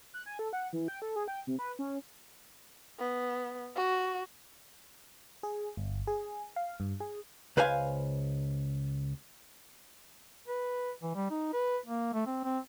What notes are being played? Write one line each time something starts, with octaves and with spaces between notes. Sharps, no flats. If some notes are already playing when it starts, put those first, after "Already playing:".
F#6
G#5
A4
F#5
E3
G5
A4
G#4
G5
C3
B4
C#4
B3
F#4
G#4
G1
G#4
F5
G2
G#4
C#2 B4 C5 F5 G#5
B4
E3
G3
D#4
B4
A#3
A3
C4
C4